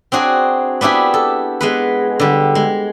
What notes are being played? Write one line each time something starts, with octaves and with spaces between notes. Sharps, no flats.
C4 D4 F#4 G#4
B3 D4 E4 G4 G#4
A4
G#3 B3 B4
D3 G3
G#3